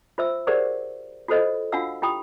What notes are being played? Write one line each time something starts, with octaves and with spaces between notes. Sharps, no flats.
F4 C5 E5 E6
G4 G#4 A#4 C5 D5 F#5
F4 F#4 A4 C5 D#5
D4 F4 F#4 F5 F#5 E6
E4 F4 G4 G5 B5 D#6